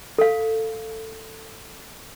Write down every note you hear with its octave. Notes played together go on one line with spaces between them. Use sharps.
A4 F5